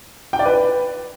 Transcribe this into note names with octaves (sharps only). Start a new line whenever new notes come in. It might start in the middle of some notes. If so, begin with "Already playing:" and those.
G5
D5
B4